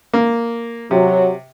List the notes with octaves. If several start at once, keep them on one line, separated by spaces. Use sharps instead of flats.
A#3
C3 F#3